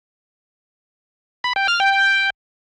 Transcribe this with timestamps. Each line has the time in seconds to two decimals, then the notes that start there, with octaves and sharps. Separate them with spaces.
1.44 B5
1.56 G5
1.68 F6
1.80 G5